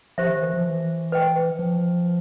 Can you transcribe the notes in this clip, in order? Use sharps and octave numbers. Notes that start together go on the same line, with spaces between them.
F3 G4 C5 E5
D#3
E3
F3
E3
B4 D#5 G5
F3